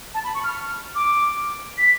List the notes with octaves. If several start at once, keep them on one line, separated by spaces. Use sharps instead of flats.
A5
B5
C#6
F6
D6
B6